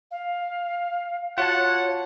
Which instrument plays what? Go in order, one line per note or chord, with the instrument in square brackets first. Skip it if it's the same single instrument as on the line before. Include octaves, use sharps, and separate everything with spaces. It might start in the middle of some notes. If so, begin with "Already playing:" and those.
[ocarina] F5
[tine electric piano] F4 F#4 A5 [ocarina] C#5 [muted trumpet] F#5